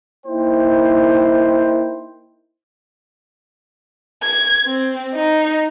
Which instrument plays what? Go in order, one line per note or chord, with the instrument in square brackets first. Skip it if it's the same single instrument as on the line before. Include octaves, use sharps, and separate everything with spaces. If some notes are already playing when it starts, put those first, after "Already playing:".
[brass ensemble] A#3 D#4 E4 C5 G5
[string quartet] G#6
C4
D#4